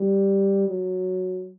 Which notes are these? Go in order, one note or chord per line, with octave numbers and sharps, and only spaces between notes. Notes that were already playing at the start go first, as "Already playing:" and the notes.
Already playing: G3
F#3